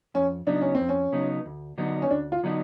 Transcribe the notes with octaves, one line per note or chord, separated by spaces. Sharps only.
F2 C#4
C#3 F#3 B3 D4 D#4
C#4
C4
F2
C#4
C#3 F#3 B3 D#4
D2
D3 F#3 B3 D#4
C#4
D2 D4
F4
D3 F#3 B3 D#4